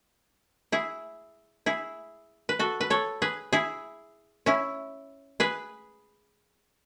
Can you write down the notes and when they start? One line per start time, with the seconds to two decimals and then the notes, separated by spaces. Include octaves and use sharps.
0.72 E4 G#4
1.66 E4 G#4
2.49 B4
2.59 F#4 A4
2.81 B4
2.90 A4 C#5
3.22 G#4 B4
3.53 E4 G#4
4.46 C#4 E4
5.40 G#4 B4